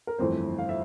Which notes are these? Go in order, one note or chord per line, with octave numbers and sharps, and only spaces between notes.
A#4
G1 F2 E3 A3 C4 C5
F5
E5